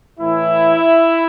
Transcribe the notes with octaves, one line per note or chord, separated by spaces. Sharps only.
A2 E3 E4